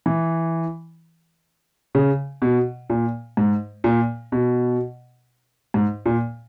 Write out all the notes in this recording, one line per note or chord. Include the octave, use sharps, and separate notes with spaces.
E3
C#3
B2
A#2
G#2
A#2
B2
G#2
A#2